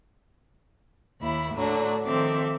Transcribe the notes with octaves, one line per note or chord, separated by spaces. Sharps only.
D#2 E4 B5
A2 D3 F#3 D4
D#3 F3 C4 A4 E5 D6